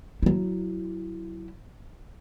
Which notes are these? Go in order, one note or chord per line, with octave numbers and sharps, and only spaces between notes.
F#3 E4